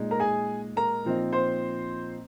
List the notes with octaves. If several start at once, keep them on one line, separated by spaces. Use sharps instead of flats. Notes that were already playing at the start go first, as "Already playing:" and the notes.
Already playing: A#2 G#3 D#4
A#4 A#5
G#4 G#5
A#4 A#5
A#2 F3 C4 D#4
C5 C6